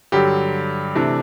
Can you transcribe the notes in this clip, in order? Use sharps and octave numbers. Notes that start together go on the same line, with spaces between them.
G2 D3 F#3 G4
C3 E3 A3 D4